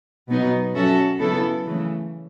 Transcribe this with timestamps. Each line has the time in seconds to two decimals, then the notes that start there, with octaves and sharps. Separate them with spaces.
0.29 B2 F#3 B3 D#4
0.74 F#3 C#4 F#4 A4 E5
1.19 C#3 F#3 B3 E4 A4
1.65 C#3 E3 A3